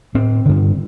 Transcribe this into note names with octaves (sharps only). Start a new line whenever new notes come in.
A2 C4
G2 D3